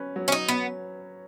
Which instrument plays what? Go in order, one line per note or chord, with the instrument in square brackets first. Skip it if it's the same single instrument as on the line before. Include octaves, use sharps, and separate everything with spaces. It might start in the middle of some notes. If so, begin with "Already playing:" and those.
Already playing: [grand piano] F#3 C#4 B4
F#3
[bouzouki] C#4
D#4
B3